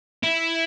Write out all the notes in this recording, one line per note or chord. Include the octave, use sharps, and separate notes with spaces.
E4